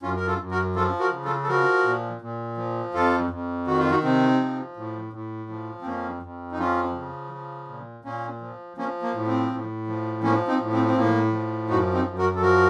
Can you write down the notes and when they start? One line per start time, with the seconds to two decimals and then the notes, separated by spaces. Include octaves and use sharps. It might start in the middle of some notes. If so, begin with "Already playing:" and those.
0.02 F#2 C#4 F4
0.16 A#4
0.27 F4 A4
0.39 F#2
0.51 F#4 A#4
0.76 F3 F4 A4
0.99 F#4 A#4
1.12 C#3
1.25 F4 A4
1.43 A4
1.48 F3 F#4 A#4
1.85 A#2
2.21 A#2
2.57 F3
2.94 F2 F4 A4
3.30 F2
3.67 D#3 F#4
3.79 F4
3.91 D#4 F#4
4.03 C3 C4 D#4
4.40 F3
4.77 A2
5.13 A2
5.49 F3
5.82 C4
5.86 F2 A#3 C#4
6.23 F2
6.52 D#4
6.59 F3 C#4 F4
6.95 C#3
7.32 F3
7.68 A#2
8.04 A#2 A#3 C#4
8.41 F3
8.77 F3 A#3 C#4
9.02 A#3
9.14 A2
9.27 C4
9.51 A2
9.88 F3
10.23 F3 A#3 C#4
10.48 C4 D#4
10.60 A2
10.72 C4
10.85 C4
10.96 A2 A#3
11.33 F3
11.69 F#2 D#4 F#4
11.93 C4 D#4
12.06 F#2
12.18 F#4 A#4
12.35 A4
12.42 F3 F#4 A#4